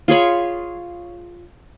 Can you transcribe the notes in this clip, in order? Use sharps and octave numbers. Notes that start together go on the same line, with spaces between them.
F4 G#4 C#5 B5